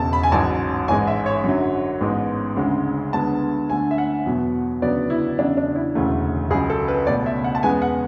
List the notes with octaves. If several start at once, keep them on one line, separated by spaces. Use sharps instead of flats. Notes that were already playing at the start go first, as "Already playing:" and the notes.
Already playing: E1 E2 C#3 A5
B5
G#5
A1 G#2 F#3 A5
A1 G#2 G#3 G#5
E5
C#5
F#2 D3 F#3
A1 G#2 G#3 B3
D2 C#3 G#3
D2 D3 G#3 B3 A5
D2 D3 A3 G#5
E5
F#5
E2 B2 F#3
D2 C#3 F#3 B3 D5
E4
E2 C#3 F#3 D4
D4
E4
E1 D2 C#3 E3 A3
C#2 C#3 F#3 G#4
A4
B4
C#2 B2 A3 D5
E5
F#5
A5
E2 C#3 G#3 B3 G#5
F#5